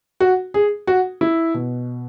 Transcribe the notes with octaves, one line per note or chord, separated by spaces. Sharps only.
F#4
G#4
F#4
E4
B2